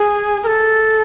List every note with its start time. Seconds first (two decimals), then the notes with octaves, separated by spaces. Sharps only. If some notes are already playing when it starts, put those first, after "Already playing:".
Already playing: G#4
0.43 A#4
0.47 A4